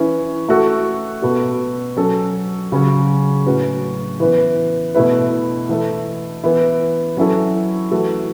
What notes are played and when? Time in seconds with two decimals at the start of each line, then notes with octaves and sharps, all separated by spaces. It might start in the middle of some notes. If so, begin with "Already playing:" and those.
Already playing: E3 C#4 E4 B4
0.48 A3 F#4 A4
1.22 B2 B3 F#4 A4
1.96 F#3 C#4 A4
2.72 C#3 F#3 C#4
3.46 A2 F#3 C#4 F#4 B4
4.20 E3 B3 E4 B4
4.95 B2 A3 E4 B4
5.69 E3 A3 E4 A4
6.44 E3 B3 E4
7.17 F#3 C#4 E4 A4
7.91 E3 A3 F#4 A4